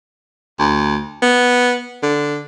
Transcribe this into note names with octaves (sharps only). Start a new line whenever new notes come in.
D2
B3
D3